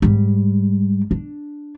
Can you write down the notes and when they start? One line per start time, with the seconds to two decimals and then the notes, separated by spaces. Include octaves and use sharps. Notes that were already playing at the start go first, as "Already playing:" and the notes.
0.02 G#2 G3
1.11 D4